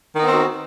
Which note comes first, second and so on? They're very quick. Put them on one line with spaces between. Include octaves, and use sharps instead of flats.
D#3 D#4 B3 C4 F#4